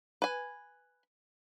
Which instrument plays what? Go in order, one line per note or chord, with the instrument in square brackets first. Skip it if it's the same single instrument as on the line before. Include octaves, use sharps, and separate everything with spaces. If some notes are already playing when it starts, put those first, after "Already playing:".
[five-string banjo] B4 G#5